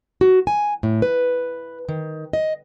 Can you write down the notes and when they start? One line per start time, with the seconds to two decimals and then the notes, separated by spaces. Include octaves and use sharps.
0.21 F#4
0.47 G#5
0.83 A2
1.02 B4
1.89 D#3
2.33 D#5